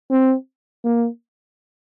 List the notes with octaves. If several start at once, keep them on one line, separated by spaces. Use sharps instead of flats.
C4
A#3